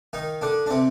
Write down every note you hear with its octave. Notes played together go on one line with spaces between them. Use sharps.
D#3 D#4
D3 D4
D4
C3 C4